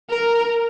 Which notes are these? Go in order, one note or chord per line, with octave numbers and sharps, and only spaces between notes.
A#4